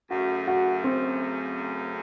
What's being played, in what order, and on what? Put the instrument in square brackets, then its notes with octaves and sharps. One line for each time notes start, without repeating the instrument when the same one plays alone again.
[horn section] F#2 C#3 A3 [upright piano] F#4
[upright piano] F#4
C4